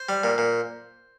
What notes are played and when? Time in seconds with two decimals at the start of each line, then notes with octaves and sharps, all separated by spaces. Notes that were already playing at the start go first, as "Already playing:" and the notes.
Already playing: C5
0.09 G3
0.24 A#2
0.38 A#2